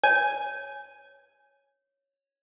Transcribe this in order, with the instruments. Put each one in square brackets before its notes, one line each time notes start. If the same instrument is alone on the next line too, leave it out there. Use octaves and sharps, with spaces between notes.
[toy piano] C#5 [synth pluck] G#5